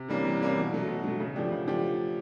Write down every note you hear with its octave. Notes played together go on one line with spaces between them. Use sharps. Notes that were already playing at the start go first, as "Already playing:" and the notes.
Already playing: C3
E3 G3 A#3 C#4
C3
E3 G3 A#3 C#4
B2
F#3 A3
B2
F#3 A3
C#3
F3 A3 D4 G4
C#3
F3 A3 D4 G4